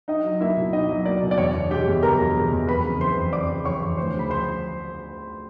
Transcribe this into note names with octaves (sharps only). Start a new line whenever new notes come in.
D#4 D#5
F#3
A#3 E4 E5
B2
D#4 D#5
F#3
A#3 D5
B2
D5
E2 C#5
B2
G#3 G4 G5
E2
E2 A#4 A#5
B2
G#3
E2
F2 B4 B5
C#3
E3 C5 C6
F2
F2 D5 D6
C#3
E3 C#5 C#6
F2
D2 C5 C6
C#3
B5
F3 C5 C6